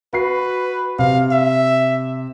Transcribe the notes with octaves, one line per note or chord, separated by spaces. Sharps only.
F#4 B4 C7
C3 F5
E5